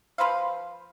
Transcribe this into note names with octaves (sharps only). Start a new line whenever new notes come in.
F3 B4 C5 F5